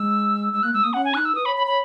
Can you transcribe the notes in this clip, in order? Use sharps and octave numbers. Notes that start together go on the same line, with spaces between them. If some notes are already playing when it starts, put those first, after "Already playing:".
Already playing: G#3 E6
G#3 E6
A#3 F#6
G#3 E6
A#3 D#6
C#4 F#5
G#5
D#4 F#6
E6
B4 D#6
C#5 B5
C#5 B5
C#5 B5